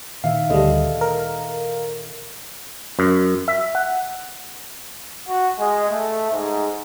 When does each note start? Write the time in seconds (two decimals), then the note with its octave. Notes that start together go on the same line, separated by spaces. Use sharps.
0.24 A#2 D#3 E5 F5
0.50 D2 G3 G#4 A4 D#5
1.01 A#4
2.99 F#2
3.48 E5
3.75 F#5
5.28 F#4
5.59 G#3
5.90 A3
6.31 G#2